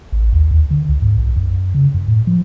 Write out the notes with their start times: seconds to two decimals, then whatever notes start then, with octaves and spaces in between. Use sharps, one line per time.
0.12 A1
0.33 D#2
0.51 D#2
0.71 D3
0.89 C#2
1.02 G#2
1.18 B1
1.36 F#2
1.74 C#3
1.94 F#2
2.08 A2
2.27 F3